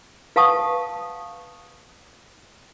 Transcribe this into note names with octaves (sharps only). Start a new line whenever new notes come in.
B4 F5 F#5 A5 C#6 D#6